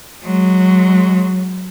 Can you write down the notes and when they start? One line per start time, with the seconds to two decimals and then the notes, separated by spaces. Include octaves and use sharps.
0.23 F#3 G#3